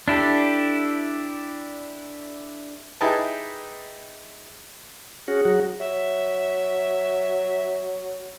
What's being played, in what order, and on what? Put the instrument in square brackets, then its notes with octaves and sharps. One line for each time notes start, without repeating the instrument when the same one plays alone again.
[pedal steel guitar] D4 E4 G4 A4
[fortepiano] D#4 E4 G4 G#4 B4 A5
[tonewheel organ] C#4 F#4 [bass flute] G#4
[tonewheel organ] F#3 F#4
[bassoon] F#3 [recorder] E5